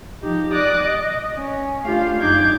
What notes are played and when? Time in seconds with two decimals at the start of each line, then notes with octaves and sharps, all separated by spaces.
0.22 F3 D#4 G4
0.52 D5 D6 D#6 F#6 A#6
0.84 D#5
1.36 C#4
1.84 A3 D4 F4 G4 F5
2.21 F#2 D4 D#4 D6 G6 G#6